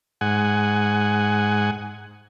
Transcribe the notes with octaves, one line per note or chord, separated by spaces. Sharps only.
G#2 F#5 G#5